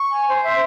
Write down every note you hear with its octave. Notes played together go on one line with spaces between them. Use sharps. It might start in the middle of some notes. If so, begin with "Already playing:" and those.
Already playing: C#6
G#5
C5
E5